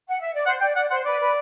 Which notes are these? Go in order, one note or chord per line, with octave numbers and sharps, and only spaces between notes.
F#5
E5
D5
C5 F#5
D5 G5
D5 F#5
C5 F#5
B4 D5
B4